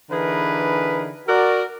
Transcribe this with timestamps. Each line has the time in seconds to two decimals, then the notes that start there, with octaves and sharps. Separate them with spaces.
0.10 D3 E3 D#4 G#4 A#4 B4
1.28 F#4 A#4 D5